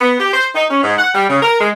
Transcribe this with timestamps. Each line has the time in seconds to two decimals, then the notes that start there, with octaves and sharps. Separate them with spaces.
0.01 B3
0.20 G4
0.34 C5
0.55 D#4
0.70 C#4
0.83 G#2
0.99 F#5
1.15 G3
1.30 C#3
1.43 A#4
1.61 G#3